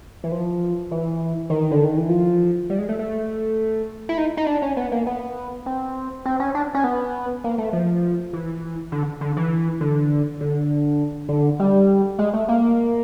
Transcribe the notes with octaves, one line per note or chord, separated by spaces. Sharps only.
E3
F3
E3
D#3
D3
D#3
E3
F3
G3
G#3
A3
A3
E4
D#4
D#4
D4
C#4
B3
A#3
B3
C4
C4
C#4
D4
C#4
B3
A#3
A3
F3
E3
D3
D3
E3
D3
D3
D3
G3
G#3
A3
A#3